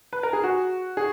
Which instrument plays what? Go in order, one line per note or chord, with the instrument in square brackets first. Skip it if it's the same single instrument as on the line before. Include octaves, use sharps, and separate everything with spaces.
[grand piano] B4
A#4
G#4
F#4
G#4